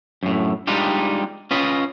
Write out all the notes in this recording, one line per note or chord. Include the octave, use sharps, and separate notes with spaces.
F#2 A2
G3 G#3 D4 D#4 F4 G4
C#4 F4 B4 D#5